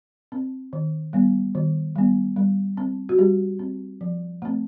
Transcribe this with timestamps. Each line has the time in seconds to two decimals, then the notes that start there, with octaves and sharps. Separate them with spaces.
0.32 C4
0.73 D#3
1.13 G3 B3
1.55 D#3
1.96 G3 B3
2.36 G3
2.77 C4
3.09 F#4
3.18 G3 G4
3.59 C4
4.01 F3
4.42 A3 C4